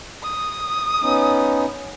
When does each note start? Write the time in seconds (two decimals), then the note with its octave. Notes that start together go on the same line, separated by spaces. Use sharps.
0.22 D#6
1.02 B3 C#4 D#4